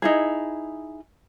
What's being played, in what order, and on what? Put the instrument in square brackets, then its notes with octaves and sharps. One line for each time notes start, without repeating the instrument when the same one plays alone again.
[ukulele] D#4 E4 G#4